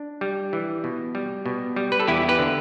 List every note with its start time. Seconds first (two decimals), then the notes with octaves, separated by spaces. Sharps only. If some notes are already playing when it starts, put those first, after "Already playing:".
Already playing: D4
0.21 G3
0.53 E3
0.84 B2
1.15 G3
1.46 B2
1.76 G3
1.92 B4
2.00 A4
2.08 E2 E4 G4
2.29 G4 B4
2.39 D3